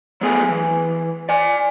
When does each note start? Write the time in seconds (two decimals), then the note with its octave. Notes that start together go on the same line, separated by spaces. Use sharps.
0.21 F#3 A3 B3 G#4 A4 G#5
0.49 E3
1.29 D5 G#5